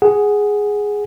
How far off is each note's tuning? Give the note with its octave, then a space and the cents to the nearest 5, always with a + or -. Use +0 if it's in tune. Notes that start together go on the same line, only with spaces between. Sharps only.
G#4 +0 F#5 +5